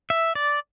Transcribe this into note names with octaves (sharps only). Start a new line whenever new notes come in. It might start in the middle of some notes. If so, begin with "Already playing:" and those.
E5
D5